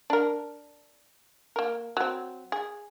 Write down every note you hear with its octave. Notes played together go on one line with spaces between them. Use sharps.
D4 A#4
A#3 A#4
F#3 C4
G#4